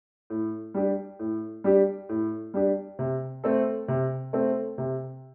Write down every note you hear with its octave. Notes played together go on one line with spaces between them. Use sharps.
A2
G3 D4 G4
A2
G3 D4 G4
A2
G3 D4 G4
C3
A3 C4 A4
C3
A3 C4 A4
C3